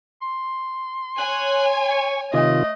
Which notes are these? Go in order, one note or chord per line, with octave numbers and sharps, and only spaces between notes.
C6
C#5 G#5 F#6
C#6
C3 D#3 A3 F4 D#5